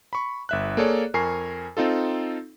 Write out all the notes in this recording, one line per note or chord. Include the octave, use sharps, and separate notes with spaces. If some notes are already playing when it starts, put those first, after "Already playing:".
B5 C#6
G1 E5 F#6
A#3 G#4 A4 C#5 D5
F2 A#4 G#5 C#6 C7
C4 D#4 F4 A4